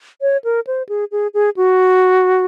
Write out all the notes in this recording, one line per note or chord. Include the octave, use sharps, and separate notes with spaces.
C#5
A#4
C5
G#4
G#4
G#4
F#4